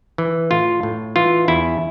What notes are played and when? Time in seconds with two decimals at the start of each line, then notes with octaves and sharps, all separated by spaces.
0.18 E3
0.51 A2 F4
0.83 A2
1.16 E3 F4
1.48 E2 E4